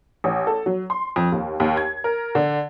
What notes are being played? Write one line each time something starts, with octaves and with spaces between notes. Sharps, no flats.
A1
A4
F#3
C6
F2
D#2
D#2
G#6
A#4
D3